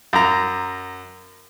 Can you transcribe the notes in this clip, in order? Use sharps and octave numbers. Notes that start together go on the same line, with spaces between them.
F#2 A#5